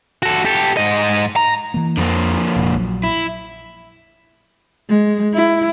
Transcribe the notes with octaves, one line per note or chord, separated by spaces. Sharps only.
F#4 A4
G4 A4
G#2 D#5
A#5
E3 A#3
F2 D3 F3 A#3
F1 A#2
A#1 F#3
E4
G#3
E4